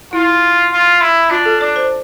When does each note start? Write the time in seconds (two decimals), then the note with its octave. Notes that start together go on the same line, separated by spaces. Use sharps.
0.13 E4 F4
0.72 F4
1.01 E4
1.31 D4 F4
1.45 A4
1.61 D4 D5
1.76 C5